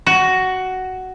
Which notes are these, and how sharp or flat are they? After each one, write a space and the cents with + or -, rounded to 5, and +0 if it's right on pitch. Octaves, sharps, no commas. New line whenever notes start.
F#4 +10